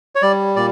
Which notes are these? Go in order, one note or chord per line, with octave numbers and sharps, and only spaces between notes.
C#5
G3 D5
A#2 D5